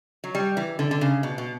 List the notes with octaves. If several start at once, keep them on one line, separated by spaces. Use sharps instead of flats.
F#3
G3
E3
D3
D3
C#3
B2
B2